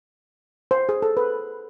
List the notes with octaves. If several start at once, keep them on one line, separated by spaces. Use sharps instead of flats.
C5
G#4
A4
B4